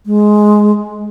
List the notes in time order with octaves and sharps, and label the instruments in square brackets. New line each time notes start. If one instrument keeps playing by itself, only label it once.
[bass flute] G#3